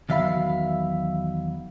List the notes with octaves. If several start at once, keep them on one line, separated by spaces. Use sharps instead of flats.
E2 D#3 F#3 E5 F5 B5